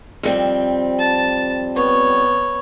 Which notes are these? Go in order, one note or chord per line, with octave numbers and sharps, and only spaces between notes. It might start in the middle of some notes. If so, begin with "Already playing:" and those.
F2 G3 C4
A5
B3 C#5